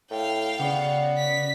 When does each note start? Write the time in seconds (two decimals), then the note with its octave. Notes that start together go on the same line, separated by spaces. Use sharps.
0.11 A2 F5 G5
0.59 C#3 B3 F#4 D5
1.18 B6